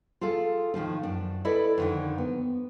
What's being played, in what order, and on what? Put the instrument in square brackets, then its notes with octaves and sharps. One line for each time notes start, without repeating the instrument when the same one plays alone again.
[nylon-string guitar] F4 G#4 A4 F5
A2 D#3 F3 F4
F#2 D4
E4 A4 B4 D5 D#5
F2 D3 D#3
B3